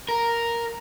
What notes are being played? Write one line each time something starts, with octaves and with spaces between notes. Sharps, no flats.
A#4